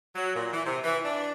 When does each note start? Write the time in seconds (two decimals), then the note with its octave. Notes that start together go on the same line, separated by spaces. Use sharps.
0.16 F#3
0.35 A#2
0.53 E3
0.66 C3
0.84 E3
1.04 D4